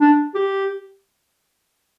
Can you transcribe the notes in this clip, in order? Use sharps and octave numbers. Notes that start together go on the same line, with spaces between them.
D4
G4